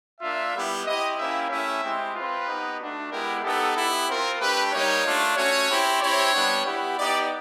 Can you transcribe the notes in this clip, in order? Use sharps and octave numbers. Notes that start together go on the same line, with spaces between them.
A#3 D4 F4 E5
G3 B3 E4 G4
C4 E4 G4 D#5
A#3 C#4 E4 G4 E5
A3 C#4 E4 G4 E5
G#3 C4 E4 G4
C4 F4 B4
B3 D#4 G4
A3 D4 F#4
G#3 B3 E4 G4 A#4
B3 D#4 G4 A4
B3 E4 G4
C4 F4 A#4
A3 D4 G4 B4
G3 A#3 D#4 G4 C#5
A3 D4 F4
A3 C#4 F#4 C#5
C4 E4 G4
C4 E4 G4 C#5
G3 B3 D4
B3 E4 G4
B3 D#4 G4 D5